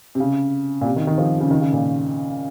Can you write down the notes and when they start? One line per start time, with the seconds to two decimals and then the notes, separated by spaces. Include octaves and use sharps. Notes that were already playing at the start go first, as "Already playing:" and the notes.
0.15 C3
0.20 C#3
0.81 A#2
0.85 C3
0.96 D#3
1.07 D#3
1.18 F3
1.40 C#3
1.51 D#3
1.61 C#3
1.73 A#2